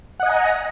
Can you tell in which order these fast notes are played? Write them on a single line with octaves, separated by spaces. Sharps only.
F#5 D#5 G#5 A#5